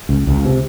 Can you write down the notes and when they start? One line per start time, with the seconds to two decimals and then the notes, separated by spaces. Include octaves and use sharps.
0.09 C#2
0.27 C#2
0.45 C3